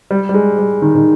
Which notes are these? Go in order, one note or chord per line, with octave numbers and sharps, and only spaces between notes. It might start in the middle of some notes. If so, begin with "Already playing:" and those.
G3
G3
G#3
G3
D#3
D#3